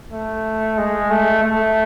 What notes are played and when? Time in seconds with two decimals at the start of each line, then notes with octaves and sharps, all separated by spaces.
0.12 A3
0.78 G#3
1.10 A3
1.43 A3